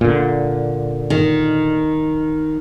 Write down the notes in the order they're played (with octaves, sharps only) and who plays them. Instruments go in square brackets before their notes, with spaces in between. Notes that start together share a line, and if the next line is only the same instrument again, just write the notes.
[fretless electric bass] A#2 D3
[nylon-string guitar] D#3